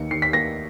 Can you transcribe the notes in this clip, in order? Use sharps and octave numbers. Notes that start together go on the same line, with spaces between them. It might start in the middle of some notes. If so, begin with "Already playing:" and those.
Already playing: D#2 D#3 A#3 C#7
D#3 C7
B6
A#3 A#6